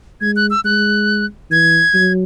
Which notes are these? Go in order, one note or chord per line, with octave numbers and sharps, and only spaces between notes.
G#3 G#6
F#6
E6
G#3 F#6
E3 G#6
F#3